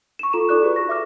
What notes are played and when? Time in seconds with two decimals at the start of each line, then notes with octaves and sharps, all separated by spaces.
0.19 C#6 E7
0.33 F4 A4 A#5 E7
0.49 D#4 A4 D5 C#6 F#6
0.63 F#4 G#4 B4
0.76 C#6 A#6
0.89 E5 D6 F6